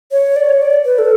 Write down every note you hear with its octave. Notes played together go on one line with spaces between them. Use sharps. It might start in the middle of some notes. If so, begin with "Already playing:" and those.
C#5
D5
C#5
D5
B4
A4